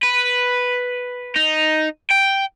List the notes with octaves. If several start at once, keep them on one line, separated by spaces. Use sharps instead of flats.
B4
D#4
G5